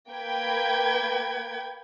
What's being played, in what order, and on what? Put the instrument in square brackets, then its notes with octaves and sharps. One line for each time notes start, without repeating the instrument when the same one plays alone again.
[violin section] A#3 B4 G5 G#6